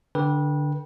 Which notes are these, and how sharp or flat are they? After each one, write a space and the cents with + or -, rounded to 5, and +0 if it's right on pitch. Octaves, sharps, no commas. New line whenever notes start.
D3 +0 B4 -25 G5 +0